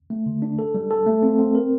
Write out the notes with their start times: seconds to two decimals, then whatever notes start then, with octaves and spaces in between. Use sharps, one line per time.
0.10 A3
0.26 D3
0.42 D4
0.59 A4
0.75 G3
0.91 A4
1.06 A3
1.23 C4
1.39 C4
1.55 A#4